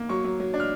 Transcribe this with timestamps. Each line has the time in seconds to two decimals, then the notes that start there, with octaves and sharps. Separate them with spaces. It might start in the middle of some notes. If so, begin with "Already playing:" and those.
Already playing: A#3
0.09 F#3 C#6
0.24 F#3
0.40 F#3
0.54 D4
0.60 F6